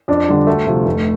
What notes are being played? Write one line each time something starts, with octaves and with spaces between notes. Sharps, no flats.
F2 D4
D3 G3
D2 A3
C3 F3
F1